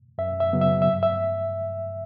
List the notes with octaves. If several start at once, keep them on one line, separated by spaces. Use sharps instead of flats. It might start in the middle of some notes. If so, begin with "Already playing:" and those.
F#2 E5
E5
C#3 F#3 B3
E5
E5
G2
E5